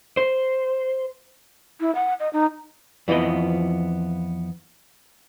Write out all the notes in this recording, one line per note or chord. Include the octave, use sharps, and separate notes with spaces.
C5
E4
F#5
D#5
D#4
F2 E3 F3 B3 D#5